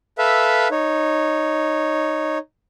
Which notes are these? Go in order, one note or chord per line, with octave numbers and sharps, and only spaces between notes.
A4 B4 E5 F5
D#4 C#5